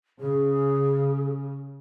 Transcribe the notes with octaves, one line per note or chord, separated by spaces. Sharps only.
C#3 G#4